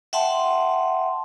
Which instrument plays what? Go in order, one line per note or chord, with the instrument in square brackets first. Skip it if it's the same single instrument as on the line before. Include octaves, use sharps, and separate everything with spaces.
[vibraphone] E5 F#5 G5 A5 C6